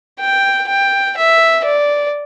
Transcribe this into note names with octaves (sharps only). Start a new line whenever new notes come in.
G5
G5
E5
D5